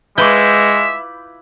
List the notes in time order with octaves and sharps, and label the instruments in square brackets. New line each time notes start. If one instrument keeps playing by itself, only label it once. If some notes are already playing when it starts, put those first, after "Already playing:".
[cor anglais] G#3 [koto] E4 F4 B4 [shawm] E5 [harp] D6 G6